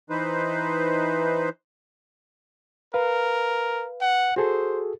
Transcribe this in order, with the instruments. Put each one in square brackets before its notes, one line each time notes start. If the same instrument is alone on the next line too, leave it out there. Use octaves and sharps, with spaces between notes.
[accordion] E3 D#4 B4 C5
[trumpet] A#4 [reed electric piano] B4 F5
[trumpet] F#5
[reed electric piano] F#4 G#4 A4 [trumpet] C5